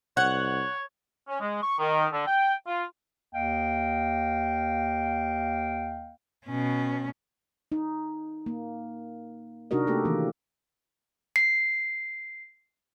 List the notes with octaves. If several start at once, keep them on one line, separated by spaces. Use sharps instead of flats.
C2 C#5 F#5
C#4
G#3
C#6
D#3
D3
G5
F4
D#2 A#3 D#5 F5 G5
B2 C#4
D#4
A#3
C3 D4 D#4 F#4 A#4 D#5
A3 A#3 G4 A4
D#3 E3 A#3
C7